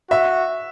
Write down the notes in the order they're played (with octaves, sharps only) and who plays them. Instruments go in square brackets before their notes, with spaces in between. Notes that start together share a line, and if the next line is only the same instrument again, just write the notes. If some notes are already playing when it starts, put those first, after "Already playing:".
[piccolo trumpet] F#4 [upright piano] E5